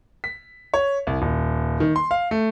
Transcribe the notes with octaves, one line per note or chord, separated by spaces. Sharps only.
B6
C#5
C2
D#1
D#3
C6
F5
A3